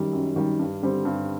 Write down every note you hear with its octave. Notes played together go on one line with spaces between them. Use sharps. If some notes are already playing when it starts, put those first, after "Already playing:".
Already playing: F#2 D#3 G3
F#2
D#3 G3
G2
D3 G3 C4
G2